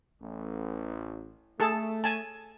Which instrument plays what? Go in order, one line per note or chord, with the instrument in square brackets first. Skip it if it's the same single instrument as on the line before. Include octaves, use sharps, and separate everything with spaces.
[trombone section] A1
[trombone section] A3 [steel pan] G#4 A4 A5
[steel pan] G#5 A5